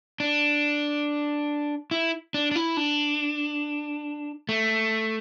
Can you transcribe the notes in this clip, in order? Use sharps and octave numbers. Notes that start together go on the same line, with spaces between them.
D4
E4
D4
D4
E4
D4
A3